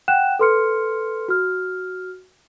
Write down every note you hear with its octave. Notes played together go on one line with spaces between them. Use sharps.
F#5 G5 F#6 E7
A4 B4 C6 F6 C#7
F#4 F6